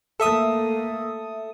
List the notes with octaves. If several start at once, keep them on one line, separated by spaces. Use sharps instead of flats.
A3 A#3 A4 E5 D#6